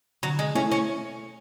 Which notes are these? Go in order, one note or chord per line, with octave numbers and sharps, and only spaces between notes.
D3 F#3
G#3
A3 C#4 E4
C#4